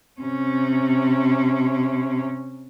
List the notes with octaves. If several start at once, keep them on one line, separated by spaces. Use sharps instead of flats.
C3 C#4